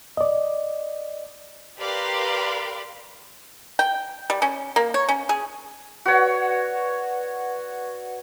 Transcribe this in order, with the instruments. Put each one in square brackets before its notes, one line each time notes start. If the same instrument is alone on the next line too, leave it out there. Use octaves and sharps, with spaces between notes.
[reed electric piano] D5 D#5
[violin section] G4 A#4 B4 D5 F5 C6
[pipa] G5
G3
C#4
A#3
C#5
C#4
G#4
[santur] F#4 C#5 [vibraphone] B4 D5 F#5